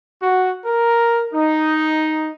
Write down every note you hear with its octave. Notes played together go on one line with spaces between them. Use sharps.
F#4
A#4
D#4